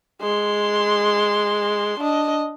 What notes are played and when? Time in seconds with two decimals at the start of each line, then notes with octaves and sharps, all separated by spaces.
0.22 G#3 C6
2.00 D4 D#5